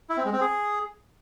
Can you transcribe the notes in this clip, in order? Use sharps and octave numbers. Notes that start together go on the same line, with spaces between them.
E4
C4
G#3
C4
G#4